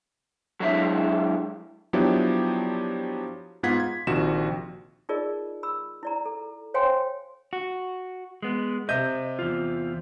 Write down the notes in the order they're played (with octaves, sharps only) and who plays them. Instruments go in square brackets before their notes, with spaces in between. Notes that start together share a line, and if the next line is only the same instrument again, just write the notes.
[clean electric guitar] F#3 G#3 D4 E4 E5
[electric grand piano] F3 F#3 B3 D4 E4 G4
G#2 B3 F4 F#5 G#6 B6
G#6
A#1 C3 D#3 F3 F#4 E7
[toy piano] D#4 F4 G#4 A#4 D5 D#5
B5 E6
E4 D5 A#5
A4
C5 C#5 F5 G5 G#5 C6
[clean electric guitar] F#4
G#3 B3
[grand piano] C3 E5 G6 [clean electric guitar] D#5
[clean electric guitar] E2 F4